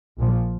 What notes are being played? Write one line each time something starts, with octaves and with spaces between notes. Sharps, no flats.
A#1 A#2 F3